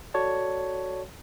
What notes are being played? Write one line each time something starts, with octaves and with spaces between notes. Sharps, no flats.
F#4 A4 C#5 D5 A5